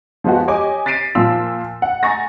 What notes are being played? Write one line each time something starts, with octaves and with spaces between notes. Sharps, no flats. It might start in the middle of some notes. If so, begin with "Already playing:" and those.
F3 G#3 B3 F4 F#4
G4 C#5 D#5 G#5 D6
A6 B6 C7 D7 D#7
A#2 F3 F4 E6
F#5
G#5 A#5 C#6 A6 A#6